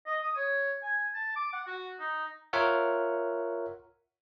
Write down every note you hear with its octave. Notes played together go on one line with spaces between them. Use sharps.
D#5
D#6
C#5
G#5
A5
D6
F#5
F#4
D#4
F4 A#4 C#5 E5 F#5